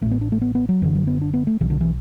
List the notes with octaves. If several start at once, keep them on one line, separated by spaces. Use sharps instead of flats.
A1 A2 A3
B3
D4
A3
B3
B3
F#3
F#1 F#2 D3 E3
F#3
B3
D4
B3
A3
B1 B2 E3
D3
E3